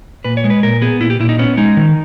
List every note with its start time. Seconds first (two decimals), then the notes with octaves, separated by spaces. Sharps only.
0.24 A#2 B4
0.37 C#5
0.44 G#3
0.50 B4
0.63 A#2 A#4
0.82 B3 G#4
1.01 A#2 E4
1.10 G4
1.20 A#2 E4
1.29 D#4
1.39 B3 C#4
1.57 G#3 D#4
1.77 D#3